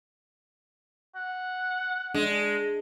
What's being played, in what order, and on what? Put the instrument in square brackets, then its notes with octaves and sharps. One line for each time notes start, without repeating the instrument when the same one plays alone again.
[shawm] F#5
[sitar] G#3 [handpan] D4